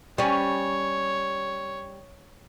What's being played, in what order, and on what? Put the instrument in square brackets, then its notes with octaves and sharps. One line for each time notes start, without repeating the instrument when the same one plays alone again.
[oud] G3 C#4 [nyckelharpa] C#5